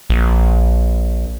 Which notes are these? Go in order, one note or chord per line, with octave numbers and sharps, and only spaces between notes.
A#1